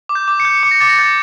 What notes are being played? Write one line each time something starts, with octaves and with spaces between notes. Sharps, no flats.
D6
G6
D6
C#7
G6
D6 C#7
A#6
D6 A6
A#6
G6 A6